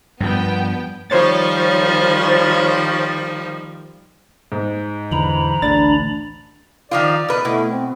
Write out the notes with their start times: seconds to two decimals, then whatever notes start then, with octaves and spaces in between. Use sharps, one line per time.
0.20 G2 F3 B3 G5
1.10 D#3 F3 G3 C5 C#5 A6
4.52 G#2
5.11 E2 D3 E3 A#5 B5
5.62 A1 D2 D4 A6
6.91 D#3 F3 F4 D5
7.28 B2 B4
7.45 B2 A3 E4
7.69 C4